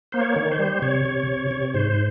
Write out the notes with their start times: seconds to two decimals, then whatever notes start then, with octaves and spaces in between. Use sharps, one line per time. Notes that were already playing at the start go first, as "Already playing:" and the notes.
0.12 A#3 C5
0.21 C#5
0.36 D#3
0.52 C5
0.59 G3
0.82 C3 C#5
1.05 C3
1.27 C3
1.51 C3
1.74 G#2 C5